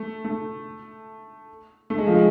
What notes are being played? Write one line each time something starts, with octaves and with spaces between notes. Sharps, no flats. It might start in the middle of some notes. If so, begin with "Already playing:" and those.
Already playing: A3
A3
A3
G#3
F3
G#3